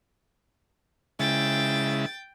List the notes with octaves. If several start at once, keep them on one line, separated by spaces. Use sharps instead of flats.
C#3 G#3 E4 G5 A6